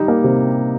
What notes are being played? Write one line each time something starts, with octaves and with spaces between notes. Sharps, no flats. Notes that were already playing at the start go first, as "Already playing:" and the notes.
Already playing: G3 D#4
A#3
C3